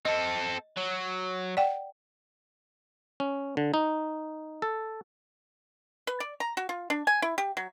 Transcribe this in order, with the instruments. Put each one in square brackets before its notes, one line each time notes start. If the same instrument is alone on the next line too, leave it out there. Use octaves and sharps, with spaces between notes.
[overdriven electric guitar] C4 A4 [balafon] D#5
[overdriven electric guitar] F#3
[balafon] D5 F#5 G5
[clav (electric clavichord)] C#4
D3
D#4
A4
[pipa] B4
D5
A#5
F#4
F4
D4
G#5
E4
G4
F#3